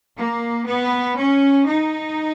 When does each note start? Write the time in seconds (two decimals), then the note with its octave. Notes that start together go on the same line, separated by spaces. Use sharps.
0.17 A#3
0.67 B3
1.17 C#4
1.66 D#4